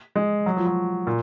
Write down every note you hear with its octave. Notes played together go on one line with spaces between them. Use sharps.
G#3
F#3
F3
F#3
A#2